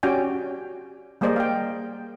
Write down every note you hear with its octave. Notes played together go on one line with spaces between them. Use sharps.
C#4 F#4 G4 D5 G5 G#5
G3 A#3 G#4 C5 D5 D#5
F5 G5